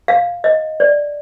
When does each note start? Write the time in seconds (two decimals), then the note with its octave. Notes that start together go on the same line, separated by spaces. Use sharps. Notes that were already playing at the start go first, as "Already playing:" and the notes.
0.08 F5
0.44 D#5
0.80 D5